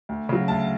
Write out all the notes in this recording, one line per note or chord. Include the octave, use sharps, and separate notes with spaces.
D2
C#3 F#3
D2 A5